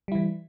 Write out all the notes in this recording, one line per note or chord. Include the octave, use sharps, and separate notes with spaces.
E3 G3 E4